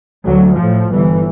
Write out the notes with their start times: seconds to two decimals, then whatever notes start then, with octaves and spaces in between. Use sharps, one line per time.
0.23 D2 F#3
0.56 A2 F3
0.91 G1 E3